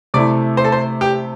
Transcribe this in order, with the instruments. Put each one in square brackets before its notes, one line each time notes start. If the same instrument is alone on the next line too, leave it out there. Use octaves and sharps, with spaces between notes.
[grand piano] C3 A3 E4 [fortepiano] D5
[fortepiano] C5
A4
C5
G4